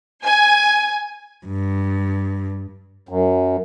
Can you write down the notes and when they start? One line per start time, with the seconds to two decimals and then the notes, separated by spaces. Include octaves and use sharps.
0.24 G#5
1.46 G2
3.09 F#2